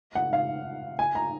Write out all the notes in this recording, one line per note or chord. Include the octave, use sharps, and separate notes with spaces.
F#5
F5
G#5
A#5